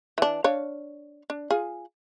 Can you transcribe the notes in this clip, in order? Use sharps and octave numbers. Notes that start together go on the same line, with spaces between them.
E3 D4
D4 C#5 F5
D4
F4 G#4